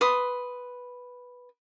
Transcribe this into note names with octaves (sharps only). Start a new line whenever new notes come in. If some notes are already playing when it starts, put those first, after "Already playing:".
B4 C6 D#6